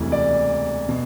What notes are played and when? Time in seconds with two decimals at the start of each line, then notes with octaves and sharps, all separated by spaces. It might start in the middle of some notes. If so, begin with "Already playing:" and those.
Already playing: E1 D2 C3 E3
0.12 D5
0.88 B2